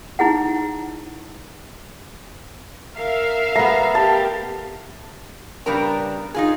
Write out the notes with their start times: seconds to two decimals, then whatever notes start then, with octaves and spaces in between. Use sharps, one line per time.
0.19 D#4 E4 G#4 F#5
2.97 A#4 E5 F5
3.56 A3 B3 A#5
3.95 G4 A#4 A5
5.66 C#3 G3 B3 D4 A#4 A#5
6.34 D#4 F4 G#4